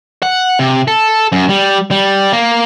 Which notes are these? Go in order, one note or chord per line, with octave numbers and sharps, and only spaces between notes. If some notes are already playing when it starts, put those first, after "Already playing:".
F#5
C3
A4
F#2
G3
G3
A#3